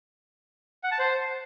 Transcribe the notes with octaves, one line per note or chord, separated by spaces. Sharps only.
F#5
A5
C5